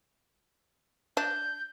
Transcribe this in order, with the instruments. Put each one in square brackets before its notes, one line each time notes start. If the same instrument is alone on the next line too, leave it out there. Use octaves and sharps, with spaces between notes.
[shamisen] D4 [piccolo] G6